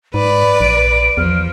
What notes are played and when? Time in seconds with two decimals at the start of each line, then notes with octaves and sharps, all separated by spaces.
0.14 G#2 B4 D5 B5
0.60 A#1 D7
1.17 E2 F3 F6